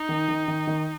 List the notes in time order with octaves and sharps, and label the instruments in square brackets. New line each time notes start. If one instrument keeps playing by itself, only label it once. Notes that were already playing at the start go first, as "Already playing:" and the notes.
Already playing: [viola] D#4
[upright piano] D#3
D#3
D#3
D#3